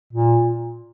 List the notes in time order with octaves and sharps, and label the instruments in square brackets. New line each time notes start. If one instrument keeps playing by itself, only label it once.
[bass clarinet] A#2